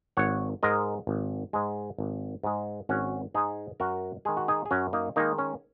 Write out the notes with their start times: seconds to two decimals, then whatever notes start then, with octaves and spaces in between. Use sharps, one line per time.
0.17 G#1 C#5 F#5
0.63 G#2 G#3 A#4 D#5
1.07 G#1
1.53 G#2 G#3
1.98 G#1
2.44 G#2 G#3
2.89 G#1 C#4 F#4
3.34 G#2 G#3 D#4 G#4
3.80 F#2 F#4 A#4
4.25 D#3 G#3 G#4
4.37 F#4
4.48 D#4 G#4
4.66 G#4
4.71 F#2 C#4 F#4
4.93 A#3 D#4
5.16 D#3 G#3 A#3 D#4
5.38 C#4